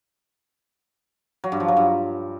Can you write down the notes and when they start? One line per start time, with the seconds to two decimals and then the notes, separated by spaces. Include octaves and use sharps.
1.44 F#3
1.52 G2
1.60 F3
1.68 F#3
1.77 G2